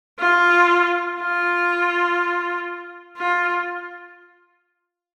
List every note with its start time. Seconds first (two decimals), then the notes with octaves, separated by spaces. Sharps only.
0.19 F4
1.20 F4
3.17 F4